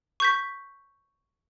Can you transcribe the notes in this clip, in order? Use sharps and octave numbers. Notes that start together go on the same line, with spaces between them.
C#6 G6 B6